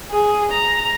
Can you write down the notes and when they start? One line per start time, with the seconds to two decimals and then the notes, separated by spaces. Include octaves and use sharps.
0.10 G#4
0.53 A#5